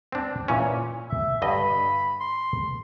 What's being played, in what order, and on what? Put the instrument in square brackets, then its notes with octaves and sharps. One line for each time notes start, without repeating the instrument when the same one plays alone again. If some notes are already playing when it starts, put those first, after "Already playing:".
[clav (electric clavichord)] C4 D4
A#2 E3 C#4
[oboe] E5
[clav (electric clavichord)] G2 D3 D#5 [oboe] B5
[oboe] C6